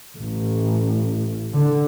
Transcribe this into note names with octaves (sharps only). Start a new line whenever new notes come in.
A1
D3